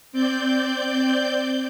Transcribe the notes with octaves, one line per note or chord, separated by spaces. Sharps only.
C4 D5 G6